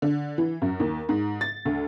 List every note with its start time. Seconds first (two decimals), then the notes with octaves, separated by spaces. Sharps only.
0.02 D3
0.38 E3
0.62 F#2
0.80 D#2
1.09 G#2
1.41 A6
1.65 D2